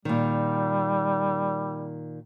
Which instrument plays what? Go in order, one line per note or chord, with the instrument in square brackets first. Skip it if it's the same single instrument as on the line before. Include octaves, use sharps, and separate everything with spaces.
[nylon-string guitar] A#2 D#3 [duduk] G3